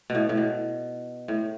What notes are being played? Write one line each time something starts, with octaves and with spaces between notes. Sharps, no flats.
B2
A2
A2
B2
A2